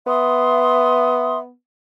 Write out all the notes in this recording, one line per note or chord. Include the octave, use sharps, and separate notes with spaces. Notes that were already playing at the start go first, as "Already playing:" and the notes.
B3 E5 C6 D#6